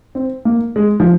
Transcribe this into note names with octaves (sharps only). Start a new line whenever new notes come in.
C4
A#3
G#3
F3